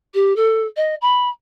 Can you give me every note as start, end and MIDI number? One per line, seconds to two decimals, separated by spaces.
0.14 0.33 67
0.36 0.66 69
0.76 0.95 75
1.01 1.29 83